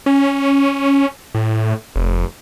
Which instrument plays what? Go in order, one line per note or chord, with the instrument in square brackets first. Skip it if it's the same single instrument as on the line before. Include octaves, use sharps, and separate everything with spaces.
[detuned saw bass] C#4
A2
F1